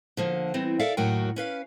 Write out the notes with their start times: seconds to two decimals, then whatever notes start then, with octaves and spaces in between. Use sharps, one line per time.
0.17 D3 F3 A#3
0.54 E3 G3 C4
0.79 A4 A#4 D5 E5 F5
0.97 D#2 A2 F#3 F#4 A#4 G5
1.36 C#4 B4 F5